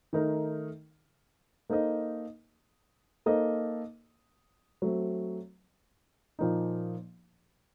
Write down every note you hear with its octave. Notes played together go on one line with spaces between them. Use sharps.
D#3 A3 D#4 A#4
A#3 D#4 A4 C5 D#5
A#3 D#4 A4 C5 D#5
F#3 A3 C4
A#2 F3 A#3 D#4